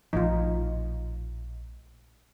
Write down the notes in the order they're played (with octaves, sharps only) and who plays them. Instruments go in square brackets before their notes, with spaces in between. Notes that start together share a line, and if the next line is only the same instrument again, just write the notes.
[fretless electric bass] A#1 A2 F3 [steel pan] D#4 F4